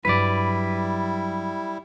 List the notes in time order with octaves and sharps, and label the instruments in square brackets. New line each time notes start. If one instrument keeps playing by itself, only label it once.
[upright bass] G2 F#3 [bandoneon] G3 E4 [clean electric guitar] B4 D5